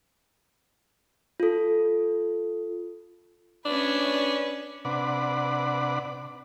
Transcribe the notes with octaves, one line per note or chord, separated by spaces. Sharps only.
F4 A4
C#4 D4 B4
C3 D4 B4 D5 F#5